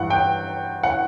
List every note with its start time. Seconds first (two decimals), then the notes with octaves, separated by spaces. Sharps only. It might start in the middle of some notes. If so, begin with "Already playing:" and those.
Already playing: G2 E3 F#5
0.10 G5
0.83 F#5